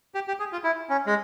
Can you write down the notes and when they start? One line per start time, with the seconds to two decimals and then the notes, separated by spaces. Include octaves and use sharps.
0.15 G4
0.28 G4
0.40 G#4
0.52 F4
0.64 E4
0.89 C#4
1.06 G#3